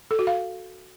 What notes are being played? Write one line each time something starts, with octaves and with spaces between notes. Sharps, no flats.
A4
F#4
F5